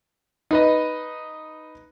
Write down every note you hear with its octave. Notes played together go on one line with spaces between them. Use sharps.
D#4 B4 D#5